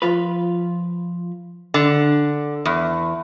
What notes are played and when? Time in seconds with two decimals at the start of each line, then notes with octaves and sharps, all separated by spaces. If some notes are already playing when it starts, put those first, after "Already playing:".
0.02 F3 F4 B4
1.74 D3
2.66 E2